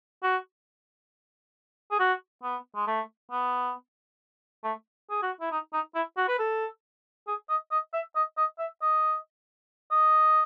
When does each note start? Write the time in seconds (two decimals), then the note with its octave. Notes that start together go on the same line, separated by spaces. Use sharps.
0.23 F#4
1.91 G#4
1.99 F#4
2.43 B3
2.75 G#3
2.87 A3
3.31 B3
4.63 A3
5.10 G#4
5.22 F#4
5.41 E4
5.51 D#4
5.73 D#4
5.95 E4
6.17 F#4
6.28 B4
6.39 A4
7.27 G#4
7.49 D#5
7.71 D#5
7.93 E5
8.15 D#5
8.37 D#5
8.59 E5
8.82 D#5
9.91 D#5